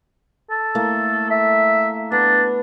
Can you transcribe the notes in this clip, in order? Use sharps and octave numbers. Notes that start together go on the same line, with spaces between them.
A4
A3 A#3 E4
E5
B3 D4